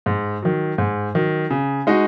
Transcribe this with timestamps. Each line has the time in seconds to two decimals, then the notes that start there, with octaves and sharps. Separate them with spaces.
0.06 G#2
0.42 D#3 F#3
0.78 G#2
1.15 D#3 F#3
1.50 C#3
1.87 G#3 D#4 F#4